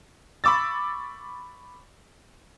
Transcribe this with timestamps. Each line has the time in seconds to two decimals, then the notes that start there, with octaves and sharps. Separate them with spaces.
0.44 B5 C#6 D6 E6 A6